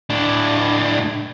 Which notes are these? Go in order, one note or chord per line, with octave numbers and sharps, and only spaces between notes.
A2 D4